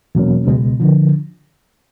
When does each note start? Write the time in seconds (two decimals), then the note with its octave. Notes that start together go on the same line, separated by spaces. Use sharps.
0.15 E2 B2 F#3 A#3 C#4
0.47 C#2 B2 G#3
0.80 D3 F3